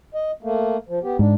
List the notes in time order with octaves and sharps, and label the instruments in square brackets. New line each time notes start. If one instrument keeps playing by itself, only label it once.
[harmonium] D#5
A3 A#3
F3
B3 G4
[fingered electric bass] G#2 [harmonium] D4